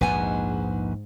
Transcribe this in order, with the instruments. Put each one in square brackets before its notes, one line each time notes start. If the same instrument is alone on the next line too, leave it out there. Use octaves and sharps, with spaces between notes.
[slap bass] A#1 D#2 [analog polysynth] G#2 [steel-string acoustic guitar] B4 F#5 G#5